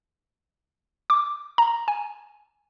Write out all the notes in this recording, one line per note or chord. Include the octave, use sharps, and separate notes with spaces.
D6
A#5
G#5